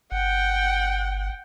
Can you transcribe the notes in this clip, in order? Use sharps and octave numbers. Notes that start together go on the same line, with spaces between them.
G1 F#5 G5